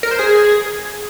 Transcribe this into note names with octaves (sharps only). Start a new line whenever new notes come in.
A#4
C5
G#4